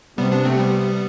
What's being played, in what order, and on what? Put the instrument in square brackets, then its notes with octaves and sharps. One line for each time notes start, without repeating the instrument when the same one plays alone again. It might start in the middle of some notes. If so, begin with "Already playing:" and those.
[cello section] C3 [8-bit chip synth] G3 B3
[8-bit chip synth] B3 D4
A3 C4
G3 B3